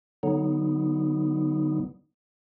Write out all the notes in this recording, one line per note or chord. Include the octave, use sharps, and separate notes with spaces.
D3 F#3 B3 D#4